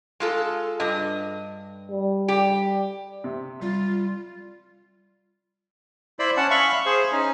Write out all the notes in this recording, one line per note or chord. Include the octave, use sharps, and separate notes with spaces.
G#3 F4 A4
G2 D#5
G3
G4
C3
G3 F4
E4 C5 D5 B5
C#4 F#5 A5
E5 F5 B5 C#6
G#4 C5
C#4 D#4